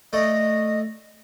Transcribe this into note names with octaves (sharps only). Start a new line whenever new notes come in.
A3 A4 D5 D#5